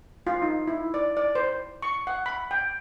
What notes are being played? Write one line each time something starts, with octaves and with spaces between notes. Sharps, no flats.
F4
D#4
E4
D5
D5
C5
C#6
F#5
B5
G5